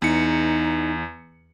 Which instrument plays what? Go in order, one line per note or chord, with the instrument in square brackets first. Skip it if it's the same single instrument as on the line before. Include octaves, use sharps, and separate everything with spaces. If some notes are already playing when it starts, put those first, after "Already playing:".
[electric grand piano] E2 C#7 [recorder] D#4